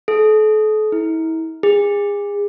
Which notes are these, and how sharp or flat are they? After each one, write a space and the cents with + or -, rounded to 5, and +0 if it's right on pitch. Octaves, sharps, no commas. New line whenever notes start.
A4 -40
E4 -35
G#4 -30